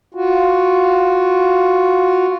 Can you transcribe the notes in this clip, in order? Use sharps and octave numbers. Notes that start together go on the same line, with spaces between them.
F4 F#4